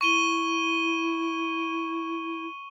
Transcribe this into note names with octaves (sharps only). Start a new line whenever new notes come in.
E4 C#6 D#7 G7